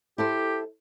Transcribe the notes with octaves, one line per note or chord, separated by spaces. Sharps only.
E4 G4 A4 C5